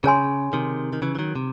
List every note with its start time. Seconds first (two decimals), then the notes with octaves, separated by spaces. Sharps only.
0.04 C#3 G#4 C#5 G#5 C6
0.53 C3 D#3
0.93 D#3
1.02 C#3 E3
1.15 E3
1.19 D#3 F#3
1.36 C3